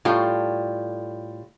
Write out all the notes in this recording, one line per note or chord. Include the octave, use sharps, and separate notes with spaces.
A2 G3 F4 G5